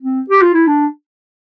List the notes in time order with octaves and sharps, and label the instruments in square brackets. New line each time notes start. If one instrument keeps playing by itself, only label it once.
[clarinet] C4
G4
F4
E4
D4